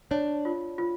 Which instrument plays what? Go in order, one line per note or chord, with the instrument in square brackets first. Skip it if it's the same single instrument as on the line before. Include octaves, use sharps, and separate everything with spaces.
[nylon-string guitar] D4 [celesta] C#5
[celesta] F4
F4